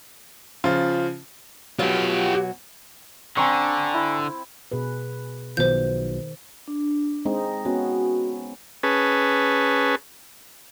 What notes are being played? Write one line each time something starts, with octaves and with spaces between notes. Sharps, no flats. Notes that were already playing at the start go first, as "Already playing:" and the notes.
C#3 F3 F4
B2 F#3 F4 G4
D3 C4 G#5 A#5 C#6
E4
B2 G#4 B4
B1 B2 D#3 F3 C5 G6
D4
G#3 C4 D#4
B3 C#4 F#4
C#4 G#4 B4 A5